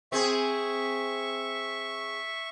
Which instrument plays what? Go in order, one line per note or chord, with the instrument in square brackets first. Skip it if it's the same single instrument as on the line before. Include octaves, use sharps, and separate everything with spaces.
[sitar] C4 G#4 [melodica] E5 C#6